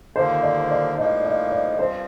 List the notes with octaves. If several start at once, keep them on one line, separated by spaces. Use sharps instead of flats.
D#2 D3 F3 A#3 C5
D5
D5
A2 F3 A#3 D#4 D#5
D#5
D5
G2 F3 C4 C5